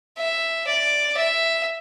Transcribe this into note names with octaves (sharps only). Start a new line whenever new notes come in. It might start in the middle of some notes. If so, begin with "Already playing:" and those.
E5
D5
E5